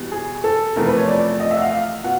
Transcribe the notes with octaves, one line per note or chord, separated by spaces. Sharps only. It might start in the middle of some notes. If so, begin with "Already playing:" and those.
Already playing: E2 B2 G3
G#4
A4
E2 C3 F3 A3 A#4
B4
C#5
D5
D#5
E5
F#5
F5
F5
B2 F#5